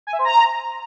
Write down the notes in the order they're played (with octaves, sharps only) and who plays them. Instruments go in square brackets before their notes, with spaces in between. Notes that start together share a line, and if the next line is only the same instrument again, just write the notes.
[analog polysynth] G#5
E5
C5
A#5